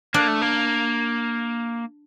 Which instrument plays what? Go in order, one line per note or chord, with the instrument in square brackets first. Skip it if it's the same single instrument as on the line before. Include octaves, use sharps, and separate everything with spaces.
[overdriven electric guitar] A#3 [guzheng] D4
[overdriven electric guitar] A3
A#3